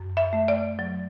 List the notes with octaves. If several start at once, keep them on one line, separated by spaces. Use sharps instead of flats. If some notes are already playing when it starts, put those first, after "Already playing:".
Already playing: F#2
E5
A3
D5
F#3